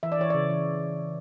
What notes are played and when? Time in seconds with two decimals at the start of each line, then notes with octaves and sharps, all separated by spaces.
0.03 E3 E5
0.12 D5
0.19 E3 C#5
0.30 C#3 D5
0.50 E3